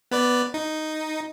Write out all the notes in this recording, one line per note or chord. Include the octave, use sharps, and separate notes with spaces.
B3 B4 D5
D#4